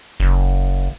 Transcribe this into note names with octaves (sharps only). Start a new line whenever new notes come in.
F#1